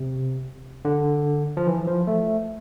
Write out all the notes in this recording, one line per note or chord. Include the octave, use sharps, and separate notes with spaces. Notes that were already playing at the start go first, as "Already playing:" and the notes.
Already playing: C3
D3
F3
E3
F3
A3